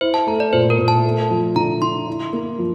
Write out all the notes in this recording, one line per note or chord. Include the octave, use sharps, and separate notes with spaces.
E4 C5
A5
A3 A#5
D5
A#2 C5
A#4
A#2
A5
A3
F3
D3 A#5
D3 C6
E4
A#3
F3